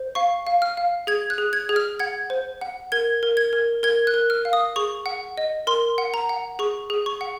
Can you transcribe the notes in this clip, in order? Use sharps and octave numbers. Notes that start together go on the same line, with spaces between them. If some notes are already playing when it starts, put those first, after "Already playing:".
Already playing: C5
F5 C#6
F5
F6
F5
G#4 G#6
F#6
G#4
G#6
G#4
F6
F#5 G#6
C5
F#5
A#4 G#6
A#4
G#6
A#4
A#4 G#6
F#6
A#4
F6
F5
D#6
G#4 C#6
F#5
D#5
A#4 C6
F#5
A#5
F#5
G#4 C#6
G#4
C#6
F#5